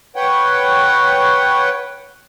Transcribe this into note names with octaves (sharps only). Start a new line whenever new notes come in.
B4 C#5 F#5 G5